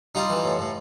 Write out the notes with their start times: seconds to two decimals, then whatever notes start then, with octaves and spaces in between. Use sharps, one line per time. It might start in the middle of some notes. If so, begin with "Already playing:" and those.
0.15 G3 D#4 F4
0.30 E3
0.45 A2
0.59 A2